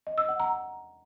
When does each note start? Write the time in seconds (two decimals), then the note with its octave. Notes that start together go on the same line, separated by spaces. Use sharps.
0.07 D#5
0.18 E6
0.29 F#5
0.40 A#5